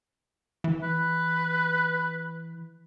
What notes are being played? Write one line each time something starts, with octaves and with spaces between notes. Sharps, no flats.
E3
B4